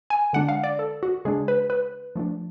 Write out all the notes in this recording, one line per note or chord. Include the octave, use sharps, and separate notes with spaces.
G#5
D3 G#3 D4 F#5
F5
D5
A4
F#4
C#3 G#3 D4 G#4
B4
B4
F3 A3 D4